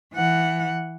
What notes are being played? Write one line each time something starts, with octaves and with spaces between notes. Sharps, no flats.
E3 F#5